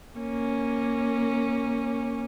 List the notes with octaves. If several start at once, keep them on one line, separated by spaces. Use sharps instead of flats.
A#3 C#4